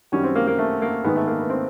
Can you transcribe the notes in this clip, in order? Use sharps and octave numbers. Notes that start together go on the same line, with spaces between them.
F#2 D#3 G3 C#4
C4
A#3
A#3
A3
A#3
G#2 D#3 G#3 B3
A3
A#3
B3
C4